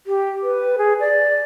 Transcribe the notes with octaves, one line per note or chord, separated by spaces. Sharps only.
G4
B4
G#4
D5